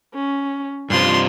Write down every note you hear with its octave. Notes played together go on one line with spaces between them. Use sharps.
C#4
G2 C3 F3 F4 C6